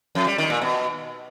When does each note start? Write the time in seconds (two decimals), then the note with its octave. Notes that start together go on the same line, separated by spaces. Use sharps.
0.15 F2
0.27 G3
0.38 D#3
0.50 A#2
0.62 B2